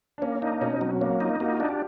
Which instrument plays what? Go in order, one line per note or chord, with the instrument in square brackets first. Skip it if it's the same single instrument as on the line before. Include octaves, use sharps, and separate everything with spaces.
[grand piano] D4
[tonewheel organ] A#3 [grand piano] C#4
[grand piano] C#4
[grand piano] D4 [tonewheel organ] D#4
[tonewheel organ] B2 [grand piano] C#4
[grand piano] C#4
[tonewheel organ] F#3 [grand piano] C4
[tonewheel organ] A#3 [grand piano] C#4
[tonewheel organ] D#4 [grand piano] F4
[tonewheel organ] A#3 [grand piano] F#4
[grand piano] F4
[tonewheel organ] D4 [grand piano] F#4
[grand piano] G4